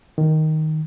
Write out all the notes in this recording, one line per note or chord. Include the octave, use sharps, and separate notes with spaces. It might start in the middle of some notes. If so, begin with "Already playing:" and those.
D#3